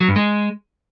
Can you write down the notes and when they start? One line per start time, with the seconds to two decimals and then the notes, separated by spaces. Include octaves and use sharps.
0.01 F#3
0.08 G2
0.16 G#3